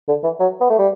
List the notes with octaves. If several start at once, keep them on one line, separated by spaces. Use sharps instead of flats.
D3
E3
F#3
B3
A3
G3